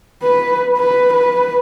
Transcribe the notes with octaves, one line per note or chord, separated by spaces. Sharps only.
B4
B4
B4